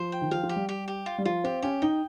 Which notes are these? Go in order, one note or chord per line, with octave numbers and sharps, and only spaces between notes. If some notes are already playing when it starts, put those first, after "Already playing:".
Already playing: F3 C5
G5
D#3
F3 F5
F3
G4
G3
G4
G4
F4
G3
F3 F4
C4 G4
C#4 G4
D#4 G5